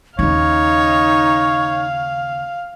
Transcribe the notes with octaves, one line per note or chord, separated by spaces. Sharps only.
D#2 C#3 D#4 C#5 F5